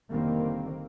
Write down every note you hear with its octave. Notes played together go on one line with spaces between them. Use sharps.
F1 D3 D#3 G3 A#3 C4